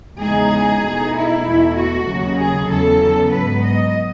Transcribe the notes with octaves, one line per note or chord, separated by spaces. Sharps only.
E2 C#3 G#3 D#4 G#4
B2 A3 D#4
E4
E2 B2 A3
F#4
D#2 C#3 F#3
G#4
E2 C#3 F#3 B3 A4
G#2 F#3 B3 B4
D#5